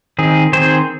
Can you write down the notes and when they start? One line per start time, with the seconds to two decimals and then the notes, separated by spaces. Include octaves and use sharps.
0.19 D#3 C4 G#4
0.53 D#3 C4 G#4 C5